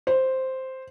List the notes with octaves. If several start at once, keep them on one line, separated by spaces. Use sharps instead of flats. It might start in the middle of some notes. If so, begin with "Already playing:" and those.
C5